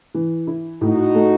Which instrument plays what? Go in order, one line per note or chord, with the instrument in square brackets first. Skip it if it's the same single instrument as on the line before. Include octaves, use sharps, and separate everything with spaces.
[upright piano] E3
E4
[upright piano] A2 [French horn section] D#4 F#4
[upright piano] A3